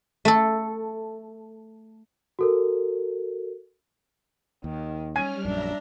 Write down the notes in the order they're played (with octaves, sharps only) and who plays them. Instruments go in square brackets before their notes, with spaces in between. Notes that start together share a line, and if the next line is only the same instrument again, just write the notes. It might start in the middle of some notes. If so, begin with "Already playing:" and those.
[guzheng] A3 A4
[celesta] F#4 A4 A#4
[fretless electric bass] D#2 [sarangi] D#3
[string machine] G3 F6 [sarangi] C#4 [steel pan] G#5
[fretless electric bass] A#1 F#2 [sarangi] D4 [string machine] E5 A#5